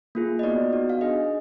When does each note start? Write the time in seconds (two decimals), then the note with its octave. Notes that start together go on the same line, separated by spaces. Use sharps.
0.15 A#3 F4 G#4
0.39 D#5
0.43 B3 D#4 F#4 D5
0.72 B3 D#4 F#4
0.89 F5
1.01 D4 G#4 D#5